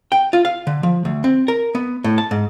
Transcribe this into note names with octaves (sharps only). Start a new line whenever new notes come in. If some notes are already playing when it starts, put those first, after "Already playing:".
G5
F4
F5
D3
F3
D2
C4
A#4
B3
A2
A5
G#2